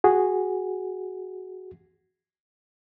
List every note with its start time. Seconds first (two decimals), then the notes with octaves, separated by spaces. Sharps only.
0.04 F#4 G#4